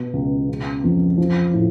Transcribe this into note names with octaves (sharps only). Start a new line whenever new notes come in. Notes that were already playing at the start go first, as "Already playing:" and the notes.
Already playing: B2
C#2
C#3
F2
F3
A2